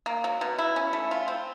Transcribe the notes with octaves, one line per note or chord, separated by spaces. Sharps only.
A#3
F#3
B2
E4
C#4
A3
F4
C4